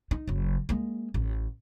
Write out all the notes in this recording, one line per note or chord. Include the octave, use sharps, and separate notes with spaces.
D#4
F#1 F#3
G#3 A#3
A1